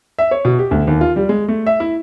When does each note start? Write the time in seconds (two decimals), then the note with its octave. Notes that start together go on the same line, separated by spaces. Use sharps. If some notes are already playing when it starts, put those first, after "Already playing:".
0.19 E5
0.31 C#5
0.45 B2
0.59 G4
0.71 D2
0.87 D#2
1.01 F4
1.16 G3
1.29 G#3
1.48 A3
1.67 E5
1.80 E4